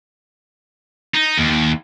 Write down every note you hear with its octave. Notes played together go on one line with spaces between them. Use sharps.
D#4
D#2